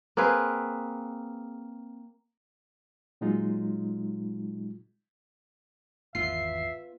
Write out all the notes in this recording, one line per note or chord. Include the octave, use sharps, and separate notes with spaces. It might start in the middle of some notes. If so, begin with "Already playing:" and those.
A#3 C4 G#4 B4
A#2 F#3 G#3 D#4 F4
G#1 E2 B3 F4 E5 C7